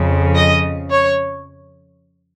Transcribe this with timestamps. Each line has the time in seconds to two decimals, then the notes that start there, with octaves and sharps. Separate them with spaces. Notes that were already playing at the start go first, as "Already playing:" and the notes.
Already playing: F2 C#3 F3
0.35 D#5
0.91 C#5